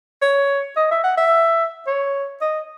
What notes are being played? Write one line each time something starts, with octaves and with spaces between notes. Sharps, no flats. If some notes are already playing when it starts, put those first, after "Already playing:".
C#5
D#5
E5
F#5
E5
C#5
D#5